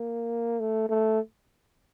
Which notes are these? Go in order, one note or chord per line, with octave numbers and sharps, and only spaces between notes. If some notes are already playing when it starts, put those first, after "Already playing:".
Already playing: A#3
A3
A3